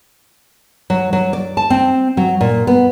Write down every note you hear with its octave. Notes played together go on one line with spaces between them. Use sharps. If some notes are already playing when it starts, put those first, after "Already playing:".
F#3
F#3
D5
A5
C4
F#3
A#2
B3